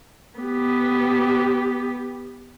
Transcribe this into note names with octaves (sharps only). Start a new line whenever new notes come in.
B3 G4